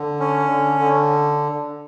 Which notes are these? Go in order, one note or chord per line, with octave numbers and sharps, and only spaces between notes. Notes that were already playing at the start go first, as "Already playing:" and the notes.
Already playing: D3
C#4
D3
D3